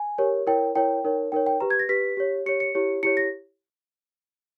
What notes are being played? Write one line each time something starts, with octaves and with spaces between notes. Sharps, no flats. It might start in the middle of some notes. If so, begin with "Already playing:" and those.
Already playing: G#5
G4 A#4 C#5
E4 A#4 C#5 G5
E4 A#4 C#5 G5
D#4 A#4 C#5
D#4 A#4 C#5 G5
G5
G4 B4 A#5
G#6
A#6
G4 B4 B6
G4 C#5
G4 C#5 C#7
C#7
E4 G4 C#5
E4 G4 C#5 C#7
A#6